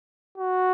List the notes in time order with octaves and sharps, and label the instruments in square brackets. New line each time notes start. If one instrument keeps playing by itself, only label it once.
[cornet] F#4